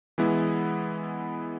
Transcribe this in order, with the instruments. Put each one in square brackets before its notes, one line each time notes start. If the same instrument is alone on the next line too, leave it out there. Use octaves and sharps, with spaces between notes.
[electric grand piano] E3 G#3 B3 E4